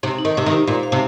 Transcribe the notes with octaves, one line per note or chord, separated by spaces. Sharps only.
C3 D#4
D#4
D#3
C3 C5
D#3
C5
A#2 C5
F5
C3